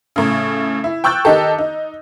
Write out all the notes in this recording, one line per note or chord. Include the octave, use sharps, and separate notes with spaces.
A2 C#3
E4
G5 C#6 E6 F#6 G6 A6
D#3 D#4 G4 A4
D#4